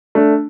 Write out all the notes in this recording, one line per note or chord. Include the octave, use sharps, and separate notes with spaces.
A3 D4